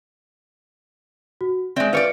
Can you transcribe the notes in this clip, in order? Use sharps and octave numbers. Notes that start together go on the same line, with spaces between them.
F#4
G#3 C4 D5 E5 G6
F4 B4 C#5 D5 C#7